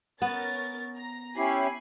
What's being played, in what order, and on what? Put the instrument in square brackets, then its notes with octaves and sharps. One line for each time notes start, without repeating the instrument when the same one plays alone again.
[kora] B3 [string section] C#4 A#4 A6
[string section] A#5
[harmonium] C#4 E4 G4 [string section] G#5 B5 C7